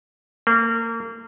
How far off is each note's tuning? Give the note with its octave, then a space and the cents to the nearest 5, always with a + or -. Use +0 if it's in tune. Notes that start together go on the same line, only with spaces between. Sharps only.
A#3 -30